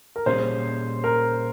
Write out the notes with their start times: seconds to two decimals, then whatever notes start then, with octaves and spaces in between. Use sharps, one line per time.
0.16 A#4
0.26 A#2 G3 C#4 G#4 C5
1.04 A#4